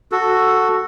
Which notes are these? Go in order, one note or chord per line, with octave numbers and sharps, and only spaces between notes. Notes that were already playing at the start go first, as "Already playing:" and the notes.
F#4 A4